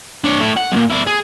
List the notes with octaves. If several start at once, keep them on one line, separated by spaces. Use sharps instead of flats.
D4 C#5
A2 E4
F#5
B1 A#2
E4 D5
G#4